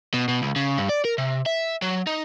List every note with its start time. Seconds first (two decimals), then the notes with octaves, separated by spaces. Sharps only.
0.14 B2
0.28 B2
0.42 C#2
0.56 C#3
0.78 G2
0.89 D5
1.05 A#4
1.18 C3
1.46 E5
1.82 F#3
2.07 D#4